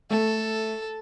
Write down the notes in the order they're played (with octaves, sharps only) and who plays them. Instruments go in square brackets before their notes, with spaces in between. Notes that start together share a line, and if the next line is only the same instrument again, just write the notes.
[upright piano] A3 [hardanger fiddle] A4